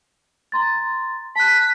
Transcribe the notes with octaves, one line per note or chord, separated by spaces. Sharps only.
A#5 C6 A6
A5 F#6 B6